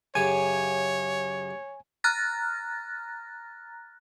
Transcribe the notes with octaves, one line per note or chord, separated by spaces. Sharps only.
F#2 C#3 G4 C#5 G#5
A#5 F6 F#6 A6 A#6